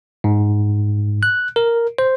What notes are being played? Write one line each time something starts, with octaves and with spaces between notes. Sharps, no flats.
G#2
F#6
A#4
C5